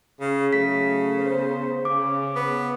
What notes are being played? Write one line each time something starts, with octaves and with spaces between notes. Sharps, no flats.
C#3
C#3 F#3 A3 B6
B3 C5
C#3 D6
B3